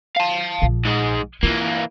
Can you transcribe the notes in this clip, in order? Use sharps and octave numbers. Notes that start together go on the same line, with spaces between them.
F5 A5
A#1 F3
G#2 G#3
E3 A#3 F4